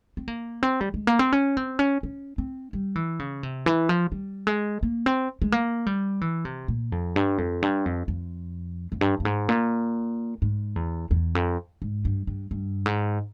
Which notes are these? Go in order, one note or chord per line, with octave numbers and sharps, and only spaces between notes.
C4
A#3
C4
G3
G#3
A#3
C4
C#4
C4
C#4
C#4
C4
G3
E3
C#3
C3
E3
F3
G3
G#3
A#3
C4
G#3
A#3
G3
E3
C3
A#2
F2
G2
F2
G2
F2
F2
F2
G2
G2
G#2
A#2
G#2
E2
E2
F2
G#2
G2
G2
G2
G#2